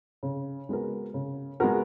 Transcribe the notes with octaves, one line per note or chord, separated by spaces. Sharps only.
C#3
G#3 B3 F#4 A#4
C#3
G#3 B3 F#4 A#4